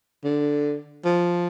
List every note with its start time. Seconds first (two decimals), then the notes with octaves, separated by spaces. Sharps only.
0.25 D3
1.05 F3